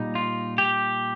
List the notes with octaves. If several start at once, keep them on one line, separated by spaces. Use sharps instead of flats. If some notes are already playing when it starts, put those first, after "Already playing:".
Already playing: A#2 G3 D#4
F4
G4